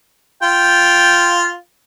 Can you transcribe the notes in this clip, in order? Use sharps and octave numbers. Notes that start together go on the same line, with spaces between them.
F4 G5